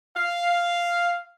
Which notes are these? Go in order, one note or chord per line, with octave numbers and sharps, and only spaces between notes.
F5